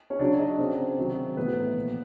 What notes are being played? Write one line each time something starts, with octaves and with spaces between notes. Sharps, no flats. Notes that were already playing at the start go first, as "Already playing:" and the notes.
C#4 C#5
C#3 F#3 D4 D5
D#4 D#5
C#3 F#3 C4 C5
C3 D#3 F#3
A2 E3 B3 B4
A#2 F3